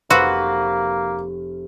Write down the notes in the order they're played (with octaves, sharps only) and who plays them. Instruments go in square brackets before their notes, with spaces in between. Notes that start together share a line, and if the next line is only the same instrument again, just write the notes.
[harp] F1 F6 A#6 [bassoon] A#3 [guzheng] F#4 [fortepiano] B4 C5 E6